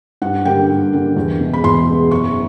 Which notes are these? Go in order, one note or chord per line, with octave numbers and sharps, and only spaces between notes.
G2 F#5
D3 G3 A#3 G5
G2
D3 G3 A#3
E2
B2 G#3
B5
E2 C6
B2 G#3
F#1 C#6